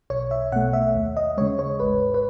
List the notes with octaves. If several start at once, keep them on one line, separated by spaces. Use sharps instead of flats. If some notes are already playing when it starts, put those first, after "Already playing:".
B1 C#5
E5
B2 A3 F#5
E5
D#2
D#5
C#3 G#3 C#5
C#5
G#1 B4
B4